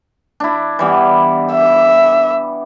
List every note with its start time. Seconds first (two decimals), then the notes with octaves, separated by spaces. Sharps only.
0.40 D4 E4
0.79 E3 G3 B3
1.52 E5